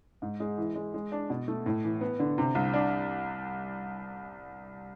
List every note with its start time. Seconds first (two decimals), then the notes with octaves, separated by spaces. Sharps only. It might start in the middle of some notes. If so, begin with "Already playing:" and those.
0.22 G#2
0.40 G#3
0.58 E3
0.75 G#3
0.94 G#3
1.12 D4
1.30 B2
1.48 A3
1.66 A2
1.84 E3
2.01 B3
2.19 D3
2.38 C3
2.55 C2
2.74 D4